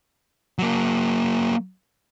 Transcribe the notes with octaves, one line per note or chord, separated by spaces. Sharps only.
F#3 A#3